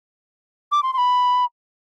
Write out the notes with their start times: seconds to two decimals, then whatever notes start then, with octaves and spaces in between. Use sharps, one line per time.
0.72 D6
0.83 C6
0.94 C6
0.98 B5